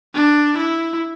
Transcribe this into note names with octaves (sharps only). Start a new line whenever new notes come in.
D4
E4